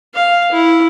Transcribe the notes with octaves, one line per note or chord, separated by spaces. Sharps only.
F5
E4